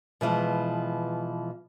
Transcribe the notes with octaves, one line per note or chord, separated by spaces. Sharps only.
B2 E3 F3 G#3